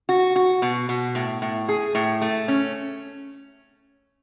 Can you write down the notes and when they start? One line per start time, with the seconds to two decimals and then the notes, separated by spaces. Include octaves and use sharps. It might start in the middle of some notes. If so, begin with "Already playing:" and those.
0.09 F#4
0.36 F#4
0.62 B2
0.89 B2
1.15 A2
1.42 A2
1.69 G#4
1.95 A2
2.22 A3
2.48 C#4